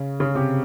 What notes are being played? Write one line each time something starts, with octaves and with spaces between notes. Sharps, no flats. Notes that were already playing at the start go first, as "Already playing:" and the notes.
Already playing: C#3
C#3
C3